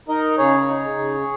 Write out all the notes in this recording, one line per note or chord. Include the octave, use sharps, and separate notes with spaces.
D#4 A#4 D#5
C#3 G#4 C#5
D#4
C#3